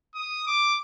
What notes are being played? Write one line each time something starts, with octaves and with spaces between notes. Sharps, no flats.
D#6
D6